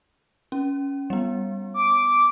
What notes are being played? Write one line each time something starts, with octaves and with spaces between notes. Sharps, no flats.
C#4
G3 B3
D6